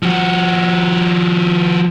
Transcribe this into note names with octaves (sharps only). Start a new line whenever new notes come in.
F3 F#4